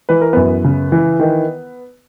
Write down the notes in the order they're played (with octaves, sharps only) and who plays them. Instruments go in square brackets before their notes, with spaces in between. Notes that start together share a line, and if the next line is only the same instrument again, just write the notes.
[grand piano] E3 B4
A#4
F#2 B3 B4
C#3
E3
D#3